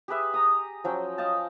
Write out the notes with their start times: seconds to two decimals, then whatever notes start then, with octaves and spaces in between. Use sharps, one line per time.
0.08 G4 G#4 B4 E5
0.34 A#5 D#6
0.84 F3 F#3 C#4 G5
1.18 D#5 F5 G5 A5